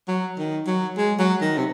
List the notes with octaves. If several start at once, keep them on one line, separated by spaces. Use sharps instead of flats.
F#3
D#3
F#3
G#3
F#3
D#3
C3